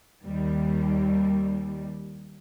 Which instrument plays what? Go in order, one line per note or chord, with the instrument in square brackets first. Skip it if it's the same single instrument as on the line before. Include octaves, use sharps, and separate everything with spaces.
[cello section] D#2 G3